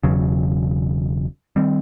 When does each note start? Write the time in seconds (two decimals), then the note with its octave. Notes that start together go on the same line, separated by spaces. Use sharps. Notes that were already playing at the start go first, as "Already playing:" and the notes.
0.03 E1 E2 C#3 F#3
1.56 D#3 G3 C4